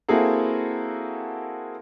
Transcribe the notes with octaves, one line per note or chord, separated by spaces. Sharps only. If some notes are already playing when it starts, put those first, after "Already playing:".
A#3 C4 E4 F#4 G#4 A4